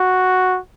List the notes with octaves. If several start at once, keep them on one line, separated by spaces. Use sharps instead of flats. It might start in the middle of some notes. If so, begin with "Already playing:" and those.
Already playing: F#4